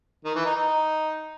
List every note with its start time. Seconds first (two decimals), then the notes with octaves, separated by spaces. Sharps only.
0.25 D#3
0.35 E3
0.45 D#4
0.55 D#4